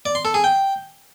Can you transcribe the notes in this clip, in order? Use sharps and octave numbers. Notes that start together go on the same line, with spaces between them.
D5
C6
A4
G#4
G5